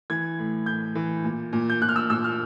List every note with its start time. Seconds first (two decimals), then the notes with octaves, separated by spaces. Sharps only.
0.10 E3 G#6
0.39 A2
0.66 A2 G6
0.95 E3
1.24 A#2
1.53 A#2
1.70 G6
1.81 A#2 F#6
1.89 F6
1.96 E6
2.10 A#2 E6
2.24 F6